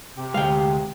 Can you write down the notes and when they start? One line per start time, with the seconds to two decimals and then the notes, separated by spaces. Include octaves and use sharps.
0.18 C3 G4
0.34 D2 G#3 F5 G5